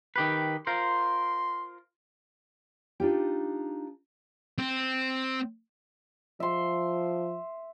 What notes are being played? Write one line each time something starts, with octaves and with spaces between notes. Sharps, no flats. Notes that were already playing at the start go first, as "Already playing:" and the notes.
D#3 G4 B4
F4 A#4 C5 C6
D4 D#4 F4 G4
C4
F3 E5 C6